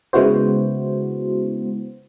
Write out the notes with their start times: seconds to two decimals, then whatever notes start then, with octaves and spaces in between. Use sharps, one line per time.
0.13 C#3 G#3 B3 E4 F#4 C5